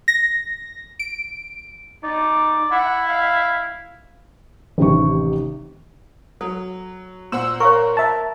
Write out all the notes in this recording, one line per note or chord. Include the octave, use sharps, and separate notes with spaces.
A#6
D7
D#4 D5
E4 F#5
F5
A1 C3 D#3 G4 C#6
F#3 A4
A#2 C5 F#5 C6 E6
A#4 C#5 F5 C#6
E5 A5